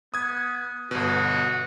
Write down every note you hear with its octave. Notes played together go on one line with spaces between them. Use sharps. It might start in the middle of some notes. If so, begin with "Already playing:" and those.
B3 D#6 G#6
G1 B2 F#4